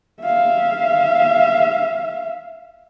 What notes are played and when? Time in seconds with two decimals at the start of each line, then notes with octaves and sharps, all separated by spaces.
0.21 E5 F5